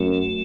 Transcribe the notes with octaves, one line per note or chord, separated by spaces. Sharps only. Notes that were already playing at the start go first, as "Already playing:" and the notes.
Already playing: F#2 A3